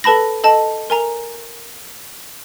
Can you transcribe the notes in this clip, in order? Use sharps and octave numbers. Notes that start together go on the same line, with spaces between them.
A4 B4 A5 B5 A#6
A4 D#5 A5
A#4 G#5 A#5